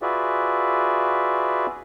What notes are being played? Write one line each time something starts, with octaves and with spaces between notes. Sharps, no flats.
F4 F#4 G#4 B4 D5 E5